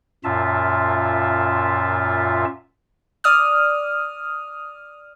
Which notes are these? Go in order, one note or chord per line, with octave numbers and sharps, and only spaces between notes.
F#2 A#2 F4 E5 A5
D5 D#6 F6